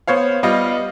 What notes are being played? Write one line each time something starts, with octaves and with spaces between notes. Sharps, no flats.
B3 C5 C#5 F5
G3 B3 F4 D#5